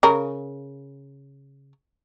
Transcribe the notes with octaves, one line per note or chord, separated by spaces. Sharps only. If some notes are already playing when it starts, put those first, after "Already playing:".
C#3 A#4